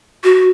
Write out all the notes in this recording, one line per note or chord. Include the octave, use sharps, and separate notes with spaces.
F#4